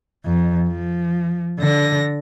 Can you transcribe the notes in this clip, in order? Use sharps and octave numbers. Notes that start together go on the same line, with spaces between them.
F2
F3
D3 A#6